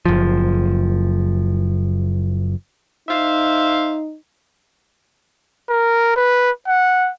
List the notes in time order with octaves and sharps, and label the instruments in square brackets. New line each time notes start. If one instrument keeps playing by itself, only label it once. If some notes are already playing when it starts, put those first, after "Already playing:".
[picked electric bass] F#1 F3
[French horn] D#4 [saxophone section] C5 E5 F5
[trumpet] A#4
B4
F#5